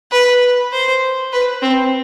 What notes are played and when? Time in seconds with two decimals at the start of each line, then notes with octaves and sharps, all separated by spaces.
0.12 B4
0.73 C5
1.33 B4
1.62 C4